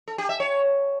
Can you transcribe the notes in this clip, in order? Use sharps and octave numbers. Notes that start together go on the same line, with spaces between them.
A4
G4
E5
C#5